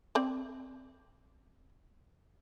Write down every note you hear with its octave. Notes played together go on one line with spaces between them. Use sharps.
C4 D5